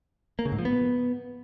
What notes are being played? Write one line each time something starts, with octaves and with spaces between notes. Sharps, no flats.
A#3
C#3
G#2
F3
B3